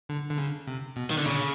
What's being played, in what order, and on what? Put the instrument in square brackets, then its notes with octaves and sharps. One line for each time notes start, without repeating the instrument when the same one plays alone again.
[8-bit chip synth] D3
D3
C#3
C3
B2
[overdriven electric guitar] D#3
D3
[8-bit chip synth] A#2 [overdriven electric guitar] C#3